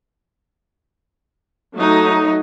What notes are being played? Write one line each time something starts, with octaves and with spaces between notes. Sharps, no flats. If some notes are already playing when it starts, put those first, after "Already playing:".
F#3 A3 D#4